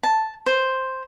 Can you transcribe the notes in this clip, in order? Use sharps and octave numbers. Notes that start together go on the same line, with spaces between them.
A5
C5